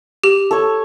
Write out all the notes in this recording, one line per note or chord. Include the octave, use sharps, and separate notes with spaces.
G4 F7
A4 C#5